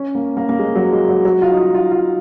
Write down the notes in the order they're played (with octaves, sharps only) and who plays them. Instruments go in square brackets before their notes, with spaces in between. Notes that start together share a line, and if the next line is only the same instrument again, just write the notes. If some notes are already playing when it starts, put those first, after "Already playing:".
Already playing: [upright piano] C#4
A#3
A#3
A#3
G#3
F#3
G#3
F#3
F#3
F4
D#4
F4
F4
F4